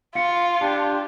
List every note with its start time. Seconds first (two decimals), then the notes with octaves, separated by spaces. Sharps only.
0.15 F4 F5 C#7
0.61 D4 G4 A5